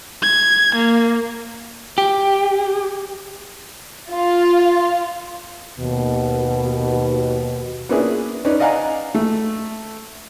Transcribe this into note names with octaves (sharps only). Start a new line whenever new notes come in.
G#6
A#3
G4
F4
D#2 B2
A#3 B3 C#4 D4 E4 G#4
C#4 D#4 B4 D5
D5 D#5 F5 F#5 G#5 A#5
A3